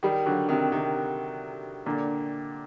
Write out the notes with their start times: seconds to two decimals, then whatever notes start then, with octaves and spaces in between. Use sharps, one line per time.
0.03 D#3 G3
0.26 D3 F#3
0.49 C3 D#3
0.72 C3 D#3
1.86 A#2 D3